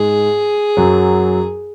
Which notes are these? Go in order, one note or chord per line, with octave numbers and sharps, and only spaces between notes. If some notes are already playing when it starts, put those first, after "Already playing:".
Already playing: G#2 G#3 G#4
F#2 F#3